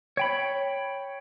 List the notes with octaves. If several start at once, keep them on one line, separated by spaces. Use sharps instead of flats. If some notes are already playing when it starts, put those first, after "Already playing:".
C#5 G5 B5